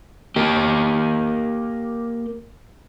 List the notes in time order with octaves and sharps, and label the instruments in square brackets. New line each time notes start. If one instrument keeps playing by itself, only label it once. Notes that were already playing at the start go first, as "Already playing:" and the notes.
[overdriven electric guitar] A#3 G4